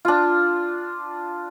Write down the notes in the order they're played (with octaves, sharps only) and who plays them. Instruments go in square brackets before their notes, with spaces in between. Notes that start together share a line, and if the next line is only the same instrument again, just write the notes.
[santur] D4 F4